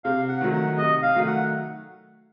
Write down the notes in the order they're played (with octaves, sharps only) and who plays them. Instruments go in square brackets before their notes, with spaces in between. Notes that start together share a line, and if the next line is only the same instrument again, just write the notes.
[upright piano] C3 [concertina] F5
[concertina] F#5
[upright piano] D#3 F#3 A3
[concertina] F#5
[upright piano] C3 [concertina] D#5
[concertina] F5
[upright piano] D#3 F#3 A3
[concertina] F#5